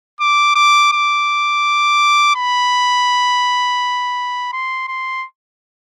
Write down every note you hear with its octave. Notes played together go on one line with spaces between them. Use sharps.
D6
D6
D6
B5
C6
C6